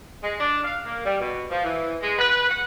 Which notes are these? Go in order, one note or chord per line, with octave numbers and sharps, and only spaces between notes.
G#3
D4
F5
A#3
G3
B2
F3
E3
G#3
B4
F#5